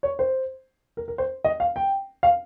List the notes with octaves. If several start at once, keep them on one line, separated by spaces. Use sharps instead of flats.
C#5
C5
A#4
A#4
C5
D#5
F5
G5
F5